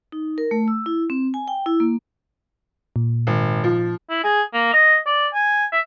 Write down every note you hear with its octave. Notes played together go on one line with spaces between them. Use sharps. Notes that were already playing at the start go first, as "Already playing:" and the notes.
D#4
A#4
A3
E6
E4
C4
G#5
G5
E4
A#3
A#2
G#1
F3
E4
G#4
A#3
D#5
D5
G#5
E5